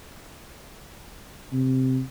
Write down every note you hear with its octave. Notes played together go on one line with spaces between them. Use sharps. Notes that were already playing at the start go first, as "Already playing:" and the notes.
C3